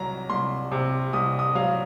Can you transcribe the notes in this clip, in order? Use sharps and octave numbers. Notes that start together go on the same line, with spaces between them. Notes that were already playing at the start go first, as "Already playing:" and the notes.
Already playing: C2 F#3 A#5
C2 C6
C3
C2 D#6
D#6
F#3 F5